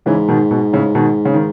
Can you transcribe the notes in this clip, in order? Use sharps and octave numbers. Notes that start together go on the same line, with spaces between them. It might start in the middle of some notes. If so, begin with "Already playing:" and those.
G#2 C#3 E3
B2 D#3
B2
A2 C#3
B2 D#3
C#3
D#3